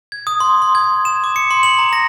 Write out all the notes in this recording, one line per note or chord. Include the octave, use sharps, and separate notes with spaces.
G#6
D#6
C6
C6
G#6
E7
D6
C#7
C6
F#7
A#5
A#6